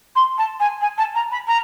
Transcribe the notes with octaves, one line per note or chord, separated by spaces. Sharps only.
C6
A5
G#5
G#5
A5
A#5
B5
A#5